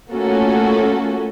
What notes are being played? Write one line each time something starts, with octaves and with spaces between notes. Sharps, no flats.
A3 A#3 C#4 F4 F#4 A4